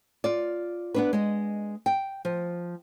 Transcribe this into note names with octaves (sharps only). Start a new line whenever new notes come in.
F4 D5
B3 D4 B4
G#3 D#5
G5
F3